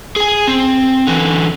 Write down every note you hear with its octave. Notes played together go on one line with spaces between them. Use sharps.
G#4 G#5
C4
D3 E3